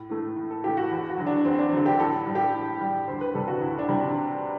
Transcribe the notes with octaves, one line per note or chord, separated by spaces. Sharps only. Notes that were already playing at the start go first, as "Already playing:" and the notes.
Already playing: A2
E3 A3
A2
A4
E3 A3 G4
F#4
E2
F#4
D3 F#3
D4
E2 C4
D4
D3 F#3
G4
A2 A4
G3
G4
A2
G3
D2 C5
B4
C3 G3 A4
F#4
D2 E4
D4
C3 G3
D4